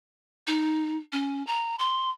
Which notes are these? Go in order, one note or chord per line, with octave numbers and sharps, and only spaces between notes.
D#4
C#4
A#5
C6